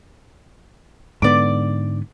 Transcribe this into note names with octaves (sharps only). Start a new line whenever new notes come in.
G#2 D3 B3 D5 D6